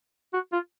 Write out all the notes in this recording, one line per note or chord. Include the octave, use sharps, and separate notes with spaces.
F#4
F4